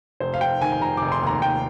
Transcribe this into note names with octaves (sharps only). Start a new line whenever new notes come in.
F1 C5
F5
F1 G5
D#3 G#5
G#5
F1 A#5
F1 D6
C6
D#2 A#5
F1 G5